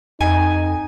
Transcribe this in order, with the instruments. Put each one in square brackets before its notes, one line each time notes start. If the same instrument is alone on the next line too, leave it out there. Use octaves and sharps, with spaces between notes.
[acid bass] F2 [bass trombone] D#4 [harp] G#5